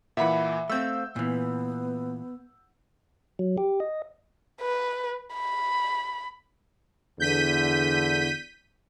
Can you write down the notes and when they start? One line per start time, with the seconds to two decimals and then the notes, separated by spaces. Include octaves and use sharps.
0.17 A#2 E3 E5 F#5 B5
0.70 A3 C4 F5 E6 G6
1.16 A#2 E3 B3
3.39 F#3
3.58 G4
3.80 D#5
4.61 B4
5.34 B5
7.20 E2 D3 G6 B6 D#7